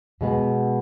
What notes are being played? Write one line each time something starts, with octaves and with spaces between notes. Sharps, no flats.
B2 G#3 B3